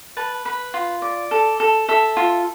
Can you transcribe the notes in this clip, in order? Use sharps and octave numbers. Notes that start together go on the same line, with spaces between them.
B4 A5
B4 B5
F4
D5
A4
A4
A4 E5
F4